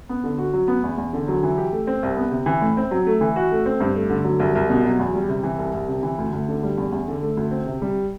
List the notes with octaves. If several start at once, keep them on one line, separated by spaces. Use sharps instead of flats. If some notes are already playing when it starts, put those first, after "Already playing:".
B3
D3
F#4
F#3
B3
E2
E2
D3
F#3
E3
G4
A3
C4
C2
B3
C3
E3
A2
C4
F#3
A3
E3
F#4
A3
C4
G2
A3
D3
F#3
C2
C2
B2
F#3
E2
G3
C3
E3
C2
C2
C3
E3
D2
D2
D3
G3
E2
E2
D3
A3
D2
C4
C3
G3